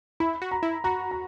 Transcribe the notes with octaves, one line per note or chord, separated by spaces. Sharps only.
E4 B5
F#4
A#5
E4
F#4 A#5
A#5